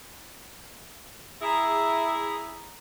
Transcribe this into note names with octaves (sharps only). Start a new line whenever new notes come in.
E4 G#4 A#5